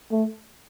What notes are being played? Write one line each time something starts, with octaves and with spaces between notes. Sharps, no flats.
A3